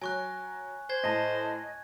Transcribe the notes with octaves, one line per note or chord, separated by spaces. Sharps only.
F#3 G#5 C#6 F#6
C5 G#6
A2 D#5 A5